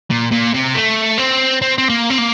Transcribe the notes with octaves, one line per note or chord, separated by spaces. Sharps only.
A#2
A#2
C3
A3
C4
C4
C4
A#3
C4
A#3